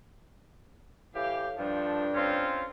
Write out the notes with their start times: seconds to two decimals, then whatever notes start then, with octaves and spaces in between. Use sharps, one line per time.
1.15 A2 E3 G4 F5
1.58 G2 F3 D4 A4
2.14 C4 C#4 F4